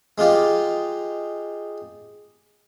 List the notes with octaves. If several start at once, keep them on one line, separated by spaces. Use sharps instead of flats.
G#3 D#4 F4 G4